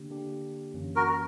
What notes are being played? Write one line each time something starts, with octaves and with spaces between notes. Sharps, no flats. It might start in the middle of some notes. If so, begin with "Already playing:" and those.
Already playing: D3 A#3 D4 G4
D3 A#3 D4 G4
F#2 E3 A#3 C#4
F#4 A#4